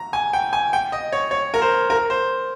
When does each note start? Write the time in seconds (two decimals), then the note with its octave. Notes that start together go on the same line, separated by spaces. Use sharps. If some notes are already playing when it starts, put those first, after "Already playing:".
Already playing: A#5
0.13 G#5
0.33 G5
0.53 G#5
0.73 G5
0.92 D#5
1.12 C#5
1.31 C#5
1.54 A#4
1.62 C5
1.90 A#4
2.10 C5